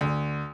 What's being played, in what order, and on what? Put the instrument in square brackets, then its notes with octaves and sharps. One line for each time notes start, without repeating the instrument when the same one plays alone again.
[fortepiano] D2